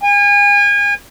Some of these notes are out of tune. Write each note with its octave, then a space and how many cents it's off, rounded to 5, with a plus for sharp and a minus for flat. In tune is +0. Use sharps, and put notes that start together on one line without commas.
G#5 -35